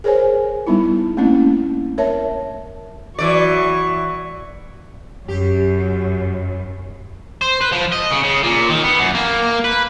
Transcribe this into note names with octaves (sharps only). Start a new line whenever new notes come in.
G#4 A#4 C5 C#5 G#5
G3 B3 D#4 E4
A3 A#3 C4 C#4 E4
A#4 C#5 E5 A5
E3 F#3 D5 C#6
F#2 G4
C5
B4
F3
D#5
C#3
C#3
A#2
D#3
B3
F#2
A#3
B4